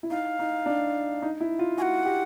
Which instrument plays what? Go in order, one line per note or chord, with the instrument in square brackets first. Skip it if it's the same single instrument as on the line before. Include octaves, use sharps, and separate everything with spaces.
[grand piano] E4
[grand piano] D#4 [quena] F5
[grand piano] D#4
D4
D#4
E4
F4
[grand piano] F#4 [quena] G#5
[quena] F#5
[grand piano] G4